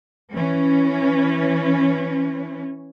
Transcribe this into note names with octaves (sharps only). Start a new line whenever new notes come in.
E3 C#4